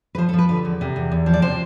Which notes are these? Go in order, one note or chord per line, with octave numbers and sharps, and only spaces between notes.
B4
F3 C5
A4
F3
B4
D3 B4
E2
C3
E2
E2
F3
D5
C3 C5